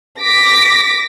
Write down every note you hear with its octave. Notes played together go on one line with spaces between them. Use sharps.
D6 A#6 B6